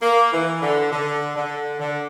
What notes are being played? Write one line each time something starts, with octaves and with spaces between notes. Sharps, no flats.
A#3
E3
D3
D3
D3
D3